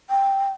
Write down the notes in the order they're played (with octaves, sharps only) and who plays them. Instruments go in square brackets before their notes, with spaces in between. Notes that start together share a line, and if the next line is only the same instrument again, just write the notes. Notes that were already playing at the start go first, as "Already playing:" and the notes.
[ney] G5